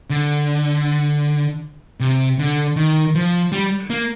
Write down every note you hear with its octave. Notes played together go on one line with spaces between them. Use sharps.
D3
C3
D3
D#3
F3
G3
A#3